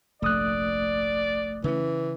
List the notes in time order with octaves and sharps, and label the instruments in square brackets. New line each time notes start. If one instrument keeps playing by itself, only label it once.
[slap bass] F1 A#1 [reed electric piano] A3 D#6 F#6 [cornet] D5
[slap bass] C#3 C#4 [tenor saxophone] E3